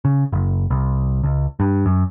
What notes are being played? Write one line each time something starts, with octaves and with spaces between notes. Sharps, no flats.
C#3
F#1
C2
C#2
G2
F#2